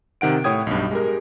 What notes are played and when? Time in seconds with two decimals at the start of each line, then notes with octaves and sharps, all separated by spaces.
0.21 C3 D#3 F#5 D7
0.44 A2 C#5 G5 D#6 G#6
0.67 B1 G2
0.91 G#3 G4 A#4